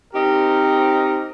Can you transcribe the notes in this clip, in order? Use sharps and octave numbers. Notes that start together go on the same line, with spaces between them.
C4 D#4 G4 A#4